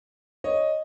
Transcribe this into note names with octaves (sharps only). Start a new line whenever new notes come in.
C#5 D#5